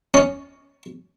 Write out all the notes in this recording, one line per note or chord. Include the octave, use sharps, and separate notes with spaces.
C#4